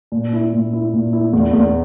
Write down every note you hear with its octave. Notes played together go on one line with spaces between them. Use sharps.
A#2
E4
A#2
E4
A#2
E4
E2
E2